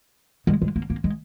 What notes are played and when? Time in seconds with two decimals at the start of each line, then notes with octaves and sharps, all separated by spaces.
0.47 G#3
0.62 G#3
0.76 A#3
0.90 A#3
1.04 G#3